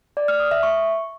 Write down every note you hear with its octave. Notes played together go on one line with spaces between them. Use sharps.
D5
F6
D#6
E5
C#6